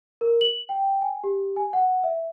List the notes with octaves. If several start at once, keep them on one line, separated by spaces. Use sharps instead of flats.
A#4
F#7
G5
G#5
G4
G#5
F#5
E5